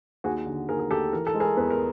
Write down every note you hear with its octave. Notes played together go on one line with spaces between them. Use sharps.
D#2 F#4 G#4
D3
D#2 G#4 A#4
G#4
D#2 G4 A4
E3 A#4
A4
G#3
G#4 A#4
E2 B4
A#4